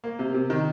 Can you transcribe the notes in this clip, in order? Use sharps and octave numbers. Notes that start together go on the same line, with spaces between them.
A#3
C3
C3
D#3